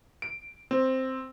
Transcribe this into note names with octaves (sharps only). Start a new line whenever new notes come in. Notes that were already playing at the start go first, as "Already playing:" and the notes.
D7
C4